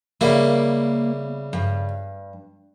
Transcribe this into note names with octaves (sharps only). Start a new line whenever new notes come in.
C#3 G3 A#3 E4
G2